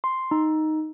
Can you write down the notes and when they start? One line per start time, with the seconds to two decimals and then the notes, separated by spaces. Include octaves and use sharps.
0.04 C6
0.31 D#4